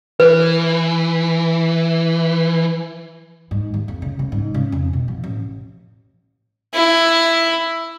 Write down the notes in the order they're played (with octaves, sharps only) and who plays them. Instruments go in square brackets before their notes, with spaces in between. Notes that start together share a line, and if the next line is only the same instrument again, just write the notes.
[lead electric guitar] E3 [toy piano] B4
[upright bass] G#2
D#2
F2
C#3
C#3
G#2
C#3
F2
B2
F3
A1
[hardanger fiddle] E4